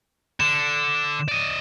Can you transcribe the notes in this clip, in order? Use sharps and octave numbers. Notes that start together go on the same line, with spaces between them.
D3 E7
D5 D#5